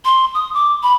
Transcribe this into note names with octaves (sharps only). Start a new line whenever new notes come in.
C6
D#6
D6
B5